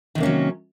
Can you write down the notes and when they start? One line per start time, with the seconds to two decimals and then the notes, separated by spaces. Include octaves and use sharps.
0.15 D#3
0.18 C3
0.20 A#3
0.23 C#4
0.25 F#3